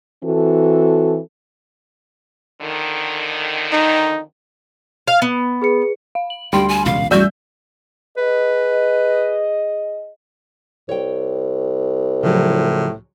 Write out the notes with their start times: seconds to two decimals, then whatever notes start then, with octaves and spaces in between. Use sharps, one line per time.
0.23 E3 C4 F#4 A4
2.61 F2 D3 D#3
3.73 D#4
5.08 F5
5.22 B3
5.62 G#4 B4 C#7
6.15 F5
6.30 F#7
6.53 D2 G3 G5 C6
6.69 G#5
6.86 E1 C#2 A#2 F5
7.11 A1 E2 G3 F#4 D5 E6 G6
8.17 G#4 B4 D#5
10.89 C2 C#5 G5
12.23 A2 C#3 F3 F#3